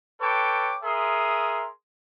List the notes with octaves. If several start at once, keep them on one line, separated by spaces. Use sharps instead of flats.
A4 B4 C#5 G5 D6
G#4 A#4 E5 C6 D#6